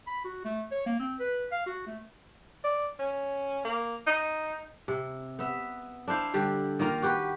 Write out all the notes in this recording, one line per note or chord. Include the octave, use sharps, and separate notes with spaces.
B5
F#4
A3
C#5
A#3
C4
B4
F5
F#4
A3
D5
C#4
A#3
D#4
C3
B3 E5
D4 E4 C5 F5
D3 G3 G4
D#3 A#3 F4
F#4 G4 B4